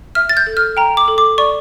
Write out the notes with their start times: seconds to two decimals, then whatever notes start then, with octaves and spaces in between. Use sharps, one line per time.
0.15 E5 F6
0.29 A6
0.37 G6
0.47 A4
0.57 F6
0.77 G5 A#5
0.97 D6
1.08 A4
1.18 D6
1.38 D5 C#6